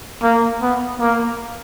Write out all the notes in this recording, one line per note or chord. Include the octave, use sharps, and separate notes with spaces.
A#3
B3
A#3